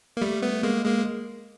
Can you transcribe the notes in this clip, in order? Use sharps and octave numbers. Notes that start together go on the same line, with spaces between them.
A#3
G3 A3
A3 B3
G#3 A#3
G#3 A#3